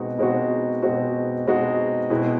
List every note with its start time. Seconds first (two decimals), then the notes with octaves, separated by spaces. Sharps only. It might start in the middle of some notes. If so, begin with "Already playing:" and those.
Already playing: B2 G#3 C4 D#4 F#4
0.19 B2 G#3 C4 D#4 F#4
0.82 B2 G#3 C4 D#4 F#4
1.47 B2 G#3 C4 D#4 F#4
2.10 B2 G#3 C4 E4